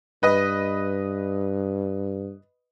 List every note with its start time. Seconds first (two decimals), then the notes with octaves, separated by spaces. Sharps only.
0.23 G2 B4 D#5